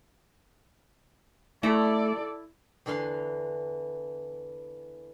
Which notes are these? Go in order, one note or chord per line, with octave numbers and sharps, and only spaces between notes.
A3 E4 A4 D5 A#5
E2 D3 E3 F5 C6